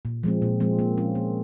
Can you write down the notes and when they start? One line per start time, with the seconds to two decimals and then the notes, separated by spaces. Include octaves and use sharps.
0.05 A#2
0.23 F3 G#3 C4
0.42 A#2
0.60 F3 G#3 C4
0.79 A#3
0.97 C#4 F4
1.15 A#3